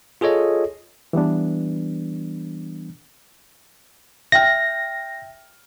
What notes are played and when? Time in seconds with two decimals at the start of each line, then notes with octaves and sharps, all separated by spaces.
0.21 F4 G#4 A4 C#5 D#5
1.13 E3 G3 B3 D4
4.32 E5 G5 F6 A#6